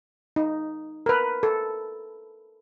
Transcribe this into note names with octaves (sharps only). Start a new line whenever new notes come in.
D#4
A#4 B4
A4